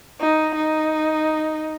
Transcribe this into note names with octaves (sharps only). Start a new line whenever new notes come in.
D#4
D#4